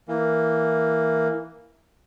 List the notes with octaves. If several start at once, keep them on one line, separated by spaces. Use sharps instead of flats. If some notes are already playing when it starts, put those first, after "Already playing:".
E3 A#3